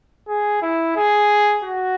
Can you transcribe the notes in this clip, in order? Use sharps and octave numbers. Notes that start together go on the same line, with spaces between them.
G#4
E4
G#4
F#4